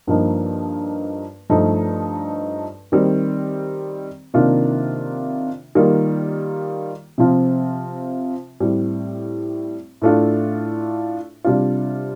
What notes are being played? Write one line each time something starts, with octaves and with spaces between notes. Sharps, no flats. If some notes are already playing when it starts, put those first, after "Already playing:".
G2 F3 A#3 D#4
G2 F3 A3 D#4
D#3 G3 C4
C3 D#3 A#3 D4 F4
D#3 G3 A#3 F4
C3 F3 C4 F4
A2 G3 C4
A2 A3 D4 F4
C3 G3 D4 F4